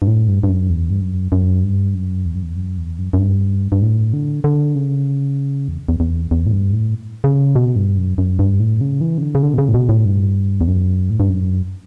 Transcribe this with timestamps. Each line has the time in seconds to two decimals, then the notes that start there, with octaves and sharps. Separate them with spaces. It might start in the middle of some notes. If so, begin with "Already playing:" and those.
0.02 G2
0.07 A2
0.28 G2
0.43 G2
0.49 F#2
0.70 E2
0.90 G2
1.01 F#2
1.32 F#2
1.64 G2
1.95 F#2
2.26 E2
2.35 F#2
2.43 E2
2.56 F#2
2.78 E2
2.99 F#2
3.13 F#2
3.19 G2
3.72 G2
3.82 A2
4.13 D3
4.44 D3
4.75 C#3
5.68 E2
5.89 E2
6.00 E2
6.31 E2
6.46 A2
6.52 G2
6.73 A2
7.24 C#3
7.55 B2
7.76 G2
7.97 F#2
8.18 F#2
8.39 G2
8.59 A2
8.81 C#3
9.01 E3
9.18 C#3
9.22 D3
9.35 C#3
9.43 D3
9.54 B2
9.58 C#3
9.68 A2
9.74 B2
9.89 A2
10.05 G2
10.61 E2
10.67 F#2
11.10 A2
11.20 G2
11.29 F#2